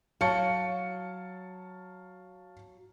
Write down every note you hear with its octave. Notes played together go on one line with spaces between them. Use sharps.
F#3 F5 A5 C#7